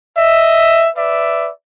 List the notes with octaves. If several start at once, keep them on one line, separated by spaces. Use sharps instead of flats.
D#5 E5
B4 D5 E5